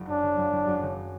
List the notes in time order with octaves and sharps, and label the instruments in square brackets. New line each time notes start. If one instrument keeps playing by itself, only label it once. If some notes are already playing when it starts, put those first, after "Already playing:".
Already playing: [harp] F#1
[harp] F#2 [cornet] D4
[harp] C#3
F#1
F#1
F#2
C#3